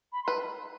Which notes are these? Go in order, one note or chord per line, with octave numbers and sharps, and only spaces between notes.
B5
C6
B4